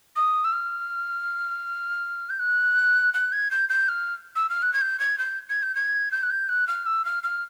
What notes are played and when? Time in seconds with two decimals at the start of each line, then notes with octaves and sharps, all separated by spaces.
0.16 D#6
0.44 E6
0.52 F6
2.30 G6
2.39 F#6
3.14 F#6
3.32 G#6
3.51 G6
3.69 G6
3.88 F6
4.36 E6
4.50 F6
4.62 F#6
4.73 G#6
4.81 G6
5.00 G#6
5.18 G6
5.49 G#6
5.62 G6
5.75 G#6
6.11 G6
6.23 F#6
6.30 G6
6.49 F#6
6.67 F6
6.86 E6
7.05 F6
7.23 F6